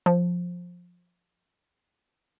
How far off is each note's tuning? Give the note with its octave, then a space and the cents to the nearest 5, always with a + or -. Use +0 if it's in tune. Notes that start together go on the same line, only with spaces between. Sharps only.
F3 +15